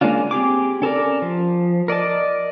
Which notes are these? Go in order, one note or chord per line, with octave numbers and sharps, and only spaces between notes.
G#3 A#3 C#4 D4 F4
C4 G4 G#4 D6
C#4 A4 A#4 D5
F3
A#4 D5 D#5 A5